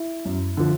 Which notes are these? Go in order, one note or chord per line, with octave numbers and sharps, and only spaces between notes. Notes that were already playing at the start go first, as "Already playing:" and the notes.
Already playing: E4
F#2
D3 F3